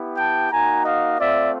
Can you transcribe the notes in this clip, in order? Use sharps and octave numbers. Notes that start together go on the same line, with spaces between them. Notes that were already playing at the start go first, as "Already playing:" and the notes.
Already playing: B3 E4 G4
G5 A5
A#3 D#4 F#4 G#5 A#5
D#5 F5
A3 C4 F4 D5 E5